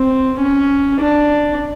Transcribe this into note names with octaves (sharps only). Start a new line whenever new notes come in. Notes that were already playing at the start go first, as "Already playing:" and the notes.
Already playing: C4
C#4
D4